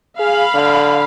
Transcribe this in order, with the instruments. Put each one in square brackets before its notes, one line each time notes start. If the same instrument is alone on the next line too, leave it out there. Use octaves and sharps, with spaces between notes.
[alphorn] G#4 [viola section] F5 B5
[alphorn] D3